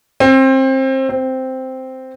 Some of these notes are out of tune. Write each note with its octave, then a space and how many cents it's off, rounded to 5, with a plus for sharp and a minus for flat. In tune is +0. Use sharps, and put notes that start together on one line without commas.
C4 +25
C4 -5